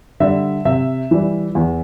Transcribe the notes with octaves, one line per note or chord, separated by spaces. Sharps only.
D3 G3 E5
C3 E5
E3 G3
E2